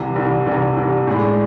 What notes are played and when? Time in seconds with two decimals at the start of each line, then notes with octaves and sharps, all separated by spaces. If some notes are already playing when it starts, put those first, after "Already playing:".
Already playing: C2 C3 E3
0.16 C2 C3 E3
0.46 C2 C3 E3
0.77 C2 C3 E3
1.07 A2 G#3 D4